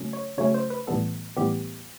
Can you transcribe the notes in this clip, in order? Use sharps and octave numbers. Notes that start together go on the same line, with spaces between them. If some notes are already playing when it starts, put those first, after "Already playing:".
Already playing: C#3 F#3 A3 C#4
C#5
C#3 F#3 A3 C#4 C#5
C5
B4
A2 E3 G3 B3 A4
A2 E3 G3 B3 G4